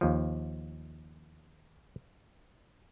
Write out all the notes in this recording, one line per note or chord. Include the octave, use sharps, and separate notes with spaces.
D#2 F3